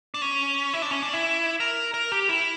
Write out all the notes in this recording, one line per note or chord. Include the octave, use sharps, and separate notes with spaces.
D4
C#4
E4
D4
C#4
D4
E4
A#4
A#4
G4
E4